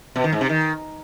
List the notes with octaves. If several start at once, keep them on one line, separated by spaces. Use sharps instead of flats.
B2
D#3
G#2
C3
D#3